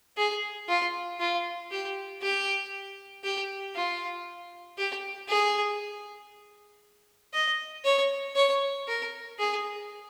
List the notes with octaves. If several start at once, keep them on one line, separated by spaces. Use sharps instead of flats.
G#4
F4
F4
G4
G4
G4
F4
G4
G#4
D#5
C#5
C#5
A#4
G#4